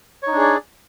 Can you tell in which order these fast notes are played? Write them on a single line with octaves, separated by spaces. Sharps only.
C#5 D#4 D4 G#4 D5